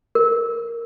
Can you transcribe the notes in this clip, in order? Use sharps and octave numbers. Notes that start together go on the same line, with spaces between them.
A#4